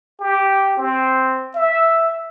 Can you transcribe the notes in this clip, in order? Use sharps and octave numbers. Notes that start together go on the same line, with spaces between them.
G4
C4
E5